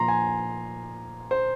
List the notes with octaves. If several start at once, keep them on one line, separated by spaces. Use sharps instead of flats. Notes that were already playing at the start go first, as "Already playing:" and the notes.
Already playing: A#2 F3 A#5 C6
G#5
C5